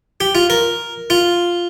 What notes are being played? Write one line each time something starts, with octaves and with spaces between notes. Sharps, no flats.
G4
F4
A#4
F4